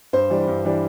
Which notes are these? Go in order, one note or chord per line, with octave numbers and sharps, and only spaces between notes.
G2 C5
E3 G3 D4
G2
E3 G3 D4